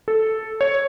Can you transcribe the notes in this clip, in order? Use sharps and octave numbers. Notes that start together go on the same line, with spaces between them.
A4
C#5